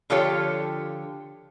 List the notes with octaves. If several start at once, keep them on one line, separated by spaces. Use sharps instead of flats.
D3 F3 F4 G4 A4 C#5